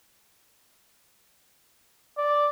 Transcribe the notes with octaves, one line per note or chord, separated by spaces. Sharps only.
D5